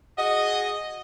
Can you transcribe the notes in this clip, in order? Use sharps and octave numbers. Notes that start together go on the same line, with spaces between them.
F#4 G#4 D#5